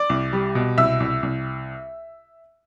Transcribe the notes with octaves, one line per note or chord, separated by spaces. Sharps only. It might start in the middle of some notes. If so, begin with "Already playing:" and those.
Already playing: D5 D6
C2
G3
B2
C2 E5 E6
C2
C2